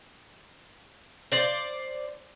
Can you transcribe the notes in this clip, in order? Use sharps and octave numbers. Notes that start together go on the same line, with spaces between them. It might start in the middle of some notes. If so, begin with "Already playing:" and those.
C5 D5